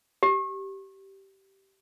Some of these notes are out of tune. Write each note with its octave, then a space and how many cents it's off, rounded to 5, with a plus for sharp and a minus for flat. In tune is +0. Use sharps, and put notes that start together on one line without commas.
G4 -15